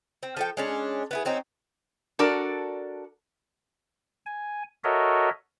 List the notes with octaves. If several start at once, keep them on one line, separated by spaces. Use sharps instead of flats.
C4
F3 A4 G5
G#3 C#4 D4
B3 E4 G#4
F#3 C4 C#4 D#4
D4 F#4 A4 A#4 D5
G#5
F#4 A4 A#4 C#5 D#5 E5